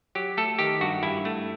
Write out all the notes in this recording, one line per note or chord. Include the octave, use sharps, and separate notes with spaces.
F#3 G4
A3 A4
D#3 G4
G2 F#4
G2 E4
A3